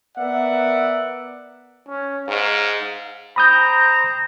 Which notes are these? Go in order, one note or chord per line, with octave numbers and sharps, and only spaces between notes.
B3 A#4 D5 E5 F#5
C#4
G#2 F5
C5 G5 A#5 B5 D#6 G6